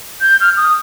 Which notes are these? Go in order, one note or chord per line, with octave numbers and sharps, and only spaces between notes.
G6
F6
D#6